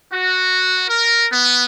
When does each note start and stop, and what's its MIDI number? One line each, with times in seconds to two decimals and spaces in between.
0.13 0.84 66
0.88 1.26 70
1.33 1.64 59